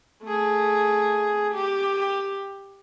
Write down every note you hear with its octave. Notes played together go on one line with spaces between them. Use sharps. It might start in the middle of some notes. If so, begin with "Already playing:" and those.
A3 G#4
G4